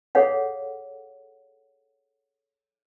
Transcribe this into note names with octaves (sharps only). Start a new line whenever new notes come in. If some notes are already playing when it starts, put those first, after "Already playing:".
G#4 A4 C#5 F5 F#5